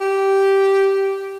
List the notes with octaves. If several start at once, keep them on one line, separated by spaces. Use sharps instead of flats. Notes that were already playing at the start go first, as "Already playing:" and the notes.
G4